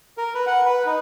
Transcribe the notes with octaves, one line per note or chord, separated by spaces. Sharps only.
A#4
B4
F#5
B4
D#4